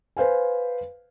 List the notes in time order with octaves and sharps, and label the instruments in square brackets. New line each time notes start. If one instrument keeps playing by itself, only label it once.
[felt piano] B4 C5 F5 G#5